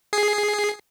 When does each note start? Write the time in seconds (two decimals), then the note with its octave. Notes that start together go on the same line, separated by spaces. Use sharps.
0.13 G#4 C7